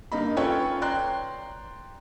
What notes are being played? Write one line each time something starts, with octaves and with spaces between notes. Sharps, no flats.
G2 A#3 D#4 B5
C#4 F4 A4 B4 C#5 G5
D5 G5 A#5 C6 F#6